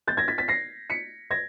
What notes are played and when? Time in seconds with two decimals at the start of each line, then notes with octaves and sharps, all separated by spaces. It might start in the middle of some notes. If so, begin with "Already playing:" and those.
0.07 G6 A6
0.17 G#6 A#6
0.28 A6 B6
0.38 A6 B6
0.48 A#6 C7
0.90 B6 C#7
1.31 G#6 A#6